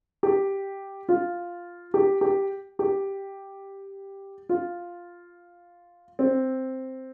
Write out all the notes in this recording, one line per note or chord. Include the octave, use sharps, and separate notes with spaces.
G4
F4
G4
G4
G4
F4
C4